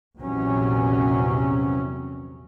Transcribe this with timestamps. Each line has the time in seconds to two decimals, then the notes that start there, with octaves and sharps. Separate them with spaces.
0.19 A#1 E2 C3 F#3 C#4